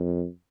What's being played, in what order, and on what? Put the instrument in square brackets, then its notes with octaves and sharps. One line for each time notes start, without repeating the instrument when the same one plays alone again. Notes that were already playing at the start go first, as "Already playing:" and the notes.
Already playing: [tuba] F2